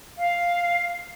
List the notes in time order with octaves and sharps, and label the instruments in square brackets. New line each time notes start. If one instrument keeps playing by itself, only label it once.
[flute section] F5